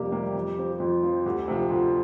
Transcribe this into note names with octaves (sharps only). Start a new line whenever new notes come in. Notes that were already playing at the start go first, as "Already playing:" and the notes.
Already playing: F2 C3 G3 A#3 G4
C3 G3 A#3
F2
F3 C4
F2 F4
F3 C4
D2 G4
C3 F3
D2 F4